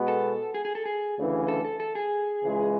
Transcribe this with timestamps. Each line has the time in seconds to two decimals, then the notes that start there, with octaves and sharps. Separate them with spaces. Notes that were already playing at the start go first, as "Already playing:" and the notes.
Already playing: B2 G#3 B3 F#4
0.08 A4
0.54 G#4
0.65 G#4
0.75 A4
0.85 G#4
1.17 D2 C#3 E3
1.48 A4
1.65 A4
1.80 A4
1.95 G#4
2.43 C#2 C#3 E3 G#3